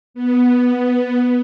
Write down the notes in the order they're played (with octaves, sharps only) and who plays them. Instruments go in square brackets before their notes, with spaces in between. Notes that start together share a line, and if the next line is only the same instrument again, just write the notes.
[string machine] B3